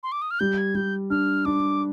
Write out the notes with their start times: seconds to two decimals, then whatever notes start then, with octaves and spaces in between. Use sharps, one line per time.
0.03 C6
0.12 D6
0.22 D#6
0.31 F6
0.40 G3 G6
0.58 G#6
0.75 G3 G6
1.10 D4 F6
1.45 D4 D6